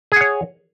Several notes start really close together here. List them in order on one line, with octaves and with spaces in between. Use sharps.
G#4 F#5 C#5